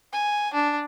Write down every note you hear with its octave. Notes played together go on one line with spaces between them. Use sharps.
G#5
D4